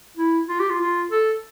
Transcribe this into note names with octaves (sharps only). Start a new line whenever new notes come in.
E4
F4
G4
F4
F4
A4